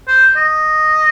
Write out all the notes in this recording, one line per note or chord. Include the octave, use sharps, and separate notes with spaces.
C5
D#5